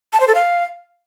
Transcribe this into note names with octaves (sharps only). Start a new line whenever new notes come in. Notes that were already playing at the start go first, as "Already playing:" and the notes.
A5
C5
A4
F5